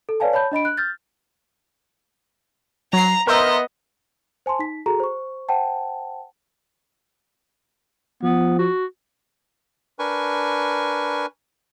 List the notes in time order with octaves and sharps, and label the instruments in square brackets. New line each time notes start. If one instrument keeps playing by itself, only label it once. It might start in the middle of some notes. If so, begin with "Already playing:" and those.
[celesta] A4
B4 C#5 D5 F5 G#5 A5
C#5 A5 B5 G6
D4 D#5 B5 D7
F#6
F6 G6 A6
[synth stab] F#3 C7 [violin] A#5
[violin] B3 D#5 [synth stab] A#4 C5 E5
[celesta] C5 G#5 A5 C6
D#4 B6
F#4 G#4 A4 A#5
C5 C#6
C5 F#5 G5 A5
[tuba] F3 [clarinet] B3
[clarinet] F#4
[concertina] D4 A#4 B4 G#5 C#6